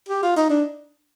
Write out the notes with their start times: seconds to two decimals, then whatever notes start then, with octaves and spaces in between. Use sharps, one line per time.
0.08 G4
0.23 F4
0.36 D#4
0.49 D4